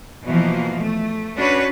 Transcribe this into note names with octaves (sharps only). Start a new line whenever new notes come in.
B2 E3 F3 A#3
A3
C#4 D4 F#4 B4 C#5